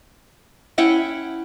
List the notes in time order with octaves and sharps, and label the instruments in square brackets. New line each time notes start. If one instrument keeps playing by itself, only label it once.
[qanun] C#4 E4 F#5 G5